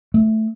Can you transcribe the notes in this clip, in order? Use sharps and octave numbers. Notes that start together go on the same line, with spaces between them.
A3